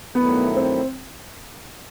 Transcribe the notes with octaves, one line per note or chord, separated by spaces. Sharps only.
G2 D#3 F#3 A3 B3 E4
C4